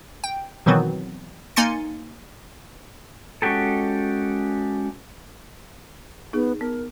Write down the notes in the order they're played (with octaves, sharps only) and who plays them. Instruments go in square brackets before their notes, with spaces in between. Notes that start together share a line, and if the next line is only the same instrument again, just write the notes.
[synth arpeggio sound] G5
B2 D#3 E3 F#3 B3 C4
A#3 D#4 G#5 C6 A6 C#7
[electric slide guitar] G#3 C#4 F#4 G4 A4
[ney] B3 [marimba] D#4 G#4
[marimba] B3 [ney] A#4